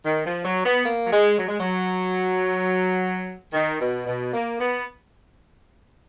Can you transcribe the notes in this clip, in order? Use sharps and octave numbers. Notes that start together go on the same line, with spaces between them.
D#3
F3
F#3
B3
A#3
F#3
G#3
F#3
G#3
F#3
D#3
B2
B2
A#3
B3